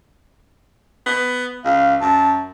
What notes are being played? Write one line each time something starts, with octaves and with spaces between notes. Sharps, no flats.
B3
C#2 F5
F#2 A5